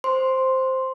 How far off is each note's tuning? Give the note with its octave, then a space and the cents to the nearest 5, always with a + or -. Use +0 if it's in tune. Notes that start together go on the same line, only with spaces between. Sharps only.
C5 +0 C6 +0